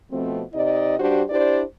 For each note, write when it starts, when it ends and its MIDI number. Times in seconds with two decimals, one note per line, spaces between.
0.11 0.43 47
0.11 0.43 53
0.11 0.43 57
0.11 0.43 60
0.53 0.95 48
0.53 0.95 63
0.53 0.95 74
0.53 0.95 75
0.99 1.22 43
0.99 1.22 62
0.99 1.22 66
0.99 1.22 67
0.99 1.22 72
1.29 1.62 62
1.29 1.62 64
1.29 1.62 67
1.29 1.62 72
1.29 1.62 74